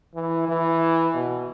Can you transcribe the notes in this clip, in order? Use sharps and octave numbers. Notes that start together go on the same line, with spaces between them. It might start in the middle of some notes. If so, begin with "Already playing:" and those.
E3
E3
B2